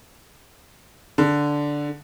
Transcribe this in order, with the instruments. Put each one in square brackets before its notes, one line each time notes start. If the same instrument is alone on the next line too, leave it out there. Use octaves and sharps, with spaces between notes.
[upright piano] D3